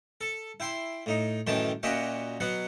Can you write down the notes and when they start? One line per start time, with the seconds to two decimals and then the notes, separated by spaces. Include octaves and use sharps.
0.21 A4
0.60 E4 G5 C6
1.06 A2 D#4
1.47 F#2 A2 D#3 E3 G5 A5
1.83 A#2 C#4 F#4 D#5 E5 G5
2.40 B2 F#3 B3 F#5